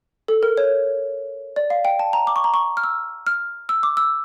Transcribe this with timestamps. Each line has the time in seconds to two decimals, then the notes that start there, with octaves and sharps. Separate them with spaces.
0.28 A4
0.43 A#4
0.58 C#5
1.56 D5
1.70 F5
1.85 G5
1.99 A5
2.13 A#5
2.27 D6
2.36 C#6
2.44 A#5
2.54 C#6
2.77 F6
2.84 E6
3.27 F6
3.69 E6
3.83 D6
3.97 E6